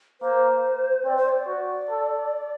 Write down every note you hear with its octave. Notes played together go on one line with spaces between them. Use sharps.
A#3 C5
C4 D5
C5
D5
F#4
A4